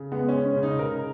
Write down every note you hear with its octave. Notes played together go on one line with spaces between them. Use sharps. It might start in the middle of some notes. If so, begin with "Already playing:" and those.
Already playing: C#3
G#3 B3
C#4
G#3
C#4
C#3
D#4
C#3 A#4